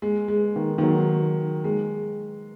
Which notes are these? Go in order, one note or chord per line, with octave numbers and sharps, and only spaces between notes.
G#3
G#3
D#3
D#3
F#3
G#3